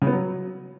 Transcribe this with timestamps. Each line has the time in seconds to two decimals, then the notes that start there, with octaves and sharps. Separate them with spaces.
0.02 C#3
0.07 B3
0.12 F#3